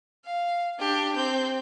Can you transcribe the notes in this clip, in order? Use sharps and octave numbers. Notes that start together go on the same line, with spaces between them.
F5
D4 G4
C4 G6